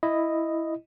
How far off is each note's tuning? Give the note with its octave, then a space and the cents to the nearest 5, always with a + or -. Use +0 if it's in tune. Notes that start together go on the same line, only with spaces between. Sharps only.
E4 +0 D#5 +0